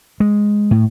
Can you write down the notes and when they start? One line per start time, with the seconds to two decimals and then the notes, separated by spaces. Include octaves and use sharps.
0.20 G#3
0.71 A2